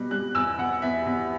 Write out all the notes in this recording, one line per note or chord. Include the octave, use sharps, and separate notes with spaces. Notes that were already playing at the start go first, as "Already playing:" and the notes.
Already playing: B2 G3 F#6
G3 F#6
E2 E6
E2 F#5
E2 E5
E2